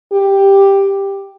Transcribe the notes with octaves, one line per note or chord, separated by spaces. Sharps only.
G4